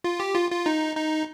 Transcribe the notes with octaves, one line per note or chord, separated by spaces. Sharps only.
F4
G4
F4
F4
D#4
D#4